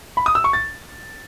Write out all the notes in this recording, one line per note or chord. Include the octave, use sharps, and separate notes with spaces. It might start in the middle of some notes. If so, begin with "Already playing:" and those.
B5
D#6
E6
C#6
A6